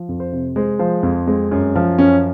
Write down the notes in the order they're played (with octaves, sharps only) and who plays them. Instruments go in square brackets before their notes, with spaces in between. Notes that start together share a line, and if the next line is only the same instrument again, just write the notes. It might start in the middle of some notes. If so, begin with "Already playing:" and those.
Already playing: [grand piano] F3
F2
C5
C3
G#3 C5
F3 C5
F2
G#3 C4
F#2
F3
F#2 C#4